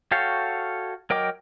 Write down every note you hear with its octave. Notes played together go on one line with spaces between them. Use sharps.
F#4 A4 C#5 F5 G5
F#3 A#4 D#5 G5 D6